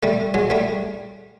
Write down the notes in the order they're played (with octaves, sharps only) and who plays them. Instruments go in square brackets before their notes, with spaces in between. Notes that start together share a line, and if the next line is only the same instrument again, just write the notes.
[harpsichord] G3 A3
F#3 G#3
G3 A3